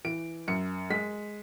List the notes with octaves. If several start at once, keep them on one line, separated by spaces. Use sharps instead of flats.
E3 D7
F#2 C#7
G#3 B6